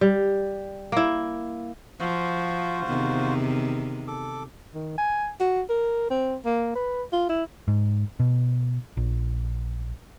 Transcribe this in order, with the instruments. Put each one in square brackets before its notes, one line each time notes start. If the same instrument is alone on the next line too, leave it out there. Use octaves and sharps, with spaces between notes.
[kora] G3
A#3 E4
[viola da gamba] F3 [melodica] F4 F#4 C5
[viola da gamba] E2 C3 D#3
[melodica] A4 D6
[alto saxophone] D#3
G#5
F#4
A#4
C4
A#3
B4
F4
E4
[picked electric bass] G#2
B2
A#1